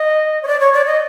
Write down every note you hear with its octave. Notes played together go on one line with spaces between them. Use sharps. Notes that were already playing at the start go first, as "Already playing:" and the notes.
Already playing: D#5
C#5
D5
C#5
D5
D#5